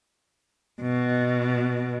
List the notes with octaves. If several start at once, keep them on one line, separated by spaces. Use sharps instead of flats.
B2